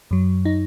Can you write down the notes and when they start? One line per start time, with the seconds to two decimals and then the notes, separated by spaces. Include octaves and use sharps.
0.11 F#2 F#3
0.45 D#4